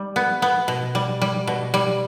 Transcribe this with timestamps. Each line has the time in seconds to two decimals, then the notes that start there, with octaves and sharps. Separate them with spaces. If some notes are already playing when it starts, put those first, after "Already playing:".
Already playing: G3
0.16 B3
0.42 B3
0.68 B2
0.95 G3
1.22 G3
1.47 B2
1.74 G3